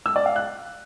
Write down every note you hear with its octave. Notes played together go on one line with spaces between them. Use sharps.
E6
D5
F5
F#6